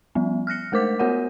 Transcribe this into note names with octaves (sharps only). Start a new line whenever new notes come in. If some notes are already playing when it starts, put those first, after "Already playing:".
F3 G3 B3
F6 F#6 A#6 C#7
G#3 A3 A#4 C5 D6 B6
B3 F#4 A#4 C#5 F#5